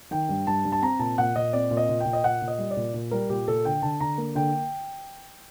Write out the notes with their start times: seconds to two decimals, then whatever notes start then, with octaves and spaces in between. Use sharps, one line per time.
0.11 D#3 G5
0.29 G2
0.47 G2 A5
0.65 G2
0.72 A5
0.82 C4 A#5
0.99 A#2 A5
1.18 A#2 F#5
1.35 A#2 D#5
1.53 C4 D5
1.71 A#2
1.77 D#5
1.89 A#2
2.00 A#2 G5
2.13 D#5
2.24 A#2 F#5
2.42 A#2
2.48 D#5
2.58 G3
2.71 D5
2.77 A#2
2.94 A#2
3.11 G3 A#4
3.29 A#2 G4
3.48 A#2 A4
3.65 D3 G5
3.82 D3 A5
4.00 D3 A#5
4.18 A#3
4.35 D3 G5